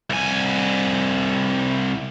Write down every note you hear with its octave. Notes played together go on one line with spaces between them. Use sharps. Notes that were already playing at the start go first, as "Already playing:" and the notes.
C2 G#5